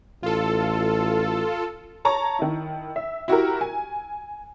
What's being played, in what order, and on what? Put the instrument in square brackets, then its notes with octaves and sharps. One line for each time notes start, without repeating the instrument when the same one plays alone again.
[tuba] A1 [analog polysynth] F4 A4
[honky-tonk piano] C#5 A5 A#5 C#6
D#3 E4
E5
E4 F#4 G4 A#4
G#5